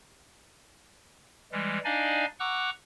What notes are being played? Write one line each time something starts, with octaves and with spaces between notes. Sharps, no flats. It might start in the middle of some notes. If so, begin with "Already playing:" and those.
E3 G3 G#3
D4 D#4 D5 D#5 F5 G#5
F#5 A#5 C#6 D6 E6 F#6